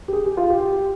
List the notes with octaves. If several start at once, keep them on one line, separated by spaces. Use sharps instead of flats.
G4
G#4
G4
F4
G4